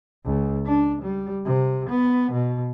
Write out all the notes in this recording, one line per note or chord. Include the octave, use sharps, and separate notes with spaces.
C#2
D4
G3
C3
B3
B2